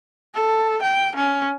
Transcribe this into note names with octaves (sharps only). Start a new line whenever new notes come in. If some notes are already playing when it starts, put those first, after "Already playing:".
A4
G5
C#4